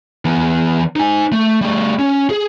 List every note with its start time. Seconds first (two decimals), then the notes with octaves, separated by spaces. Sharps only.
0.25 E3 B3
0.96 D#4 G#5
1.32 A3
1.61 G3 A3
1.99 C#4
2.30 G#4